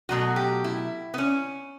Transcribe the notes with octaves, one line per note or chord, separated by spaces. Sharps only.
B2 F#3 A3 F#4
G4
E4
B3
C#4